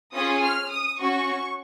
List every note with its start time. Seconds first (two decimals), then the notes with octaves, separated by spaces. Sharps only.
0.13 C#4 F4 G#4 D#6
0.42 F6
0.70 D#6
0.99 C#4 F#4 C#6